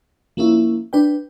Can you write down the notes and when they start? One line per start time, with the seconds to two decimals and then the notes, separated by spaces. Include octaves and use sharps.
0.37 F3 A#3 C#4 E4
0.93 D4 B4 G5